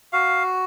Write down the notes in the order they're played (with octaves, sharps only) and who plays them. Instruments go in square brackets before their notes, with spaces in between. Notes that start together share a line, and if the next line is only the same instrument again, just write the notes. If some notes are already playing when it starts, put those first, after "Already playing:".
[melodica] F#4 F5